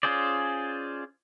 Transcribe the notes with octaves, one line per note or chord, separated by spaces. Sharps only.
C#4 F4 G#4 C5 D5